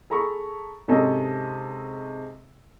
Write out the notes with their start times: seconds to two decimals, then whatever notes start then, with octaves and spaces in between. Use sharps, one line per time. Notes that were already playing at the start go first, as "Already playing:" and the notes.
0.10 G#4 A4 A#5 B5 C#6
0.88 G#2 C3 G#3 C#4 A4 D#5